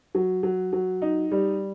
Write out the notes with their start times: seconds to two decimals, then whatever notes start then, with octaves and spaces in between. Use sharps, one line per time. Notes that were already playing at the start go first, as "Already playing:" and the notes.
0.15 F#3
0.43 F#3
0.73 F#3
1.02 D#4
1.31 G3